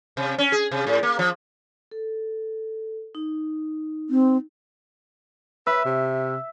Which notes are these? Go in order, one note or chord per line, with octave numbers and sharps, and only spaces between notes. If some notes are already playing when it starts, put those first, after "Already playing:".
C3
C#4
G#4
C3
A2
A#3
F3
A4
D#4
C4
B4 E5
C3